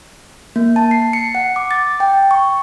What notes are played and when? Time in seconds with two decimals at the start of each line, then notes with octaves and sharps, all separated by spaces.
0.56 A#3
0.76 A5
0.91 C7
1.13 C#7
1.35 F#5
1.56 D6
1.71 A6
2.00 G5
2.31 C#6